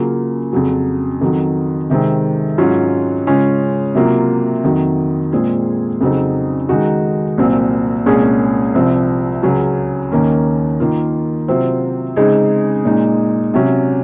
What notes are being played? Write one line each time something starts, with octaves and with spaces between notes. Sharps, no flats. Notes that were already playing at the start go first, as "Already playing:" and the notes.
Already playing: C#3 F#3 A#3 F4
F2 C#3 F#3
F2 D#3 F#3
C3 D#3 G#3 C4
G#2 F#3 C#4 F4
C#3 G#3 C#4 F4
C3 F#3 A#3 F4
F2 D#3 F#3
A#2 G#3 C4 F4 G#4
F2 C#3 F#3 C4 D#4
D#3 G#3 D#4 F#4
C2 A#2 F#3 C4
C2 A#2 G#3 C#4 G#4
C2 C3 F3 C4
C#2 C#3 F#3 C#4
D#2 D#3 A#3 C#4
D#3 A#3 F4
C3 F#3 C4 F4 C5
C#3 G#3 C4 D#4 G#4
A#2 G#3 D#4
C3 F#3 C#4